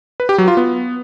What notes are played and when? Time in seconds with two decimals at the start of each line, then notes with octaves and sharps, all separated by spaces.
0.20 B4
0.29 G4
0.38 F#3
0.48 F4
0.57 B3